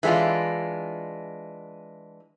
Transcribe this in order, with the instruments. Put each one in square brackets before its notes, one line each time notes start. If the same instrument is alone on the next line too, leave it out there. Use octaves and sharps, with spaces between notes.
[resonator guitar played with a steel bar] E3 G#3 B3 D4 F4